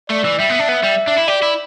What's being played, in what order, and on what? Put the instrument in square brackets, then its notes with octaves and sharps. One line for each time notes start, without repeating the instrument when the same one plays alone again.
[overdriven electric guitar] A3 [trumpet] D5
[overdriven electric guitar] E3
[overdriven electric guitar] G3 [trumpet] E5
[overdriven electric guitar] B3
D4
B3
G3
D4
E4
[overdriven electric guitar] G4 [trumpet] D5
[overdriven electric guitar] E4